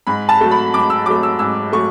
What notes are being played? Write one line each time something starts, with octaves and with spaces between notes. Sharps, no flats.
G#2 B5
A5
F#3 A3
B5
G#2 D6
E6
F#3 A3 D6
E6
G#2 E6
F#3 A3 C#6